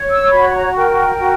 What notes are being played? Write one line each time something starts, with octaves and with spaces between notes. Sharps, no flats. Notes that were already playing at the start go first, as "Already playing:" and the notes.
Already playing: C#5
E6
F#4 B5
A#5
A#4 G5
F#4